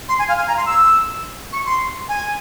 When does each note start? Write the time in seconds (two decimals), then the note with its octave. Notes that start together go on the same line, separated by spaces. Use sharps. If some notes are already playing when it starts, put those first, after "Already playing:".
0.09 C6
0.19 G#5
0.29 F5
0.38 G#5
0.47 A#5
0.57 C6
0.66 E6
1.53 C#6
1.66 C6
2.09 G#5